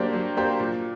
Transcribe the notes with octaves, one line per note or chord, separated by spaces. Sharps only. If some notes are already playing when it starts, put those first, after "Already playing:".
Already playing: F#3 A#3 D4 G4 C5
F#3
A#3 D4 G4 C5
A#2